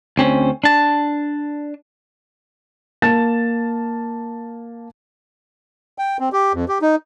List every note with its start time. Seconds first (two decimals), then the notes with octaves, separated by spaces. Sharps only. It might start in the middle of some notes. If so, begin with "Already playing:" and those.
0.18 D2 C4 C#4
0.64 D4 A5
3.02 A#3 A5 A6 E7
5.98 G5
6.20 C4
6.33 G4
6.53 F2
6.68 G4
6.82 D#4